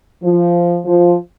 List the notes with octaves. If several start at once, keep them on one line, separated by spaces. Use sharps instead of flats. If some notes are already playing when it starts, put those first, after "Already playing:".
F3
F3